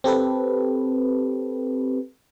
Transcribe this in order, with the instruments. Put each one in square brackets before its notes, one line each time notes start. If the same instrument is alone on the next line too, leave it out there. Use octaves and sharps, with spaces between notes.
[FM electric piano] C4 G4 A4 B4